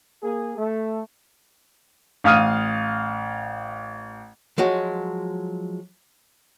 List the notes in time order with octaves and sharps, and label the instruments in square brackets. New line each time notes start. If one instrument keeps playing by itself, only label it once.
[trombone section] A#3 G#4
A3
[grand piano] A1 F5 D#6 F6 D#7
[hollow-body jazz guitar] F3 F#3 G#3 F#4